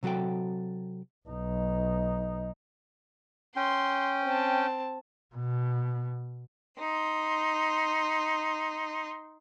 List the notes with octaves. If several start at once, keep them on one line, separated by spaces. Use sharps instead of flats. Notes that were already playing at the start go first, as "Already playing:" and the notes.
C3 F#3 F#4 A4 G5
B1 D#4
C#4 G5 C6
C4 A5
B2
D#4 C6